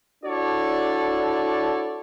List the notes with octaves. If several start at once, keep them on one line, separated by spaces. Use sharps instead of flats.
D4 E4 F#4 A4 C#5 D5